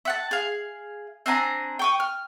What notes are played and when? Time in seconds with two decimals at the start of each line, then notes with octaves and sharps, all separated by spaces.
0.05 E5 F#5 A5
0.31 G#4 F5
1.26 C4 D4 G#5 A#5
1.79 G5 C#6 D#6
2.00 F6